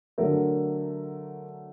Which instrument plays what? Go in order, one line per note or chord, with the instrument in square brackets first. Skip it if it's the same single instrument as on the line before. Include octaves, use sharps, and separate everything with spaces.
[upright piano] D3 F#3 A3 A#4